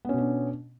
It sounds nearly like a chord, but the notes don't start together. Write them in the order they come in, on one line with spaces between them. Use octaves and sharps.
B3 C#4 B2 D4